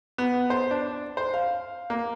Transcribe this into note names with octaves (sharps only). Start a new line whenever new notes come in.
B3
C5
D4
C5
F5
A#3